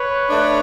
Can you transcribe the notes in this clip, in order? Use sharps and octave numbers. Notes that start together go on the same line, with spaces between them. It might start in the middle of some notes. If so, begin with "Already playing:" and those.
Already playing: B4 C#5
A3 D4